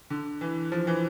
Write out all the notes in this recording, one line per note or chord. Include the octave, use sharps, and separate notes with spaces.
D3
E3
F3
E3